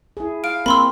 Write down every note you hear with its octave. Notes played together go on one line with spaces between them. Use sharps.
E4 G#4
F5 D7
A#3 C4 B5 C6 E6